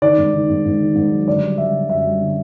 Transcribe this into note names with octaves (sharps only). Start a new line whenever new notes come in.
D#3 D5
G#2
D#3
G#2
G#2
D#3
G#2
F#3
D3 D5
G3
G3 E5
D3
F#2 E5
G3
D3